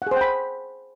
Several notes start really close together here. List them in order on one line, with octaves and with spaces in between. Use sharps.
F#5 G#4 C5 G5 B5